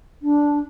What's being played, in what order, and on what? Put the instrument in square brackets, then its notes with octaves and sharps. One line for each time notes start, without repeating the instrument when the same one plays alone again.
[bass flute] D4